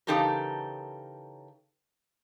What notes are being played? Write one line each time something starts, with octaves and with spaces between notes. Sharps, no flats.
C#3 E3 D#4 G4 A4 A#4